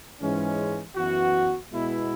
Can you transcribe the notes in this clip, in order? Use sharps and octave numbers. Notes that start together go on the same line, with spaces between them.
G#2 E3 G#3 C#4
F#2 E3 B3 F#4
B2 G#3 B3 E4